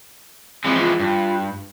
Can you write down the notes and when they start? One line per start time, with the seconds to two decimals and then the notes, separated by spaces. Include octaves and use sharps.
0.64 E3 F3 G#3 C4
0.81 F4
1.00 G2